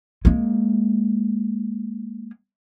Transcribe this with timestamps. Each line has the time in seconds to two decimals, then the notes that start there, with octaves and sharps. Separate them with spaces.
0.25 G#3 A#3